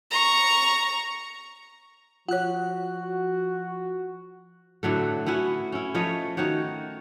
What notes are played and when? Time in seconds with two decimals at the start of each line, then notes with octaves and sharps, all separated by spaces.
0.11 A#5 C#6
2.28 F3 F4 F#4 C#5 F#5 F#6
4.83 A2 D3 F#3 A3
5.26 B3 C#4 E4 F#4
5.72 C#4 E4
5.95 F3 A3 C#5 D#5
6.37 D#3 D#4 F#4 C#5